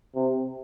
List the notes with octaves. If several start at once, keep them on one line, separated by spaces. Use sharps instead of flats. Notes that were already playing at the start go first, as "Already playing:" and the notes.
C3